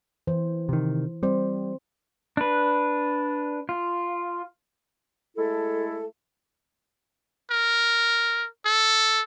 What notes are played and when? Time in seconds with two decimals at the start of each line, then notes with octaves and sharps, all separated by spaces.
0.27 E3 C5
0.69 C3 D#3 E3
1.23 G3 C4 C5
2.37 D4 B4
3.69 F4
5.37 G#3 A3 E4 A4
7.51 A#4
8.65 A4